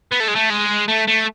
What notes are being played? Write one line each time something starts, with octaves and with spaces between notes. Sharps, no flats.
B3
A3
G#3
A3
G#3
A3
A3